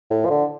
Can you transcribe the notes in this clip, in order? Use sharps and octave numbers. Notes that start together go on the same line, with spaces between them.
A2
F3
D3